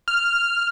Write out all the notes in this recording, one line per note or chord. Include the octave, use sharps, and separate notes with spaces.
F6